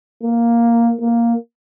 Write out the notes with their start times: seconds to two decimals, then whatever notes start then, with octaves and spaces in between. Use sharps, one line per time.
0.23 A#3
1.01 A#3